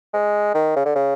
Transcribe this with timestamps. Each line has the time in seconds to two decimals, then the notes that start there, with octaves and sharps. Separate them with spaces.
0.14 G#3
0.55 D#3
0.76 C#3
0.85 D3
0.96 C#3